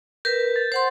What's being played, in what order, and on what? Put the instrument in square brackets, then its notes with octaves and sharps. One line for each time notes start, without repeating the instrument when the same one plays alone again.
[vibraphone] A#4 B4 [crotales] G6
[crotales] A6
[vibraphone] C5 F#5 C6